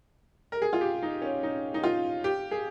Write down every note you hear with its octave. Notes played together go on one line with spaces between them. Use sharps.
A#4
G#4
F4
G4
D#4
C#4
D#4
D#4
F4
G4
G#4